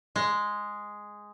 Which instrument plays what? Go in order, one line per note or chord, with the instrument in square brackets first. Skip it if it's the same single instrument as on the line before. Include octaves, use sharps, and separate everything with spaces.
[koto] G#3